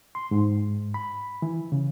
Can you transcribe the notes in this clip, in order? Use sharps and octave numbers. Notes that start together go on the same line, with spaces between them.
C6
G#2
B5
E3
C#3